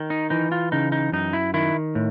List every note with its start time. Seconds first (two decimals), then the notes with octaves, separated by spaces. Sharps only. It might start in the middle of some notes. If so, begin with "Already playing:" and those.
Already playing: D#3
0.10 D#4
0.30 E3 D#4
0.52 F4
0.72 C#3 D#4
0.92 D#4
1.12 F#2 D#4
1.33 E4
1.54 D#3 E4
1.95 A2